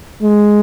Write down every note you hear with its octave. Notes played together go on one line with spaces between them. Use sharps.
G#3